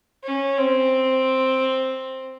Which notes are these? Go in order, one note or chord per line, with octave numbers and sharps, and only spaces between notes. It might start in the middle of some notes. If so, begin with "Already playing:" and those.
C#4
C4